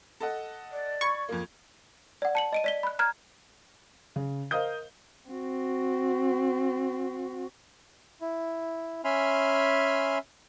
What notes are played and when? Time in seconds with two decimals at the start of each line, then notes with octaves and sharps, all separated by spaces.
0.20 A4 D#5 F#5
0.72 D5
1.01 B5 C#6 G#6
1.29 F2 F3 A#3
2.22 D5 F#5
2.35 A5 C#7 F#7
2.53 D#5 D7 D#7
2.64 D5 B6 G7
2.83 B5 F#6
2.99 A#5 F6 F#6 G#6
4.16 C#3
4.51 A#4 C5 D#5 F5 D#6 G6
5.29 C4 F#4
8.21 E4
9.04 C#4 E5 G#5 B5 C6 F6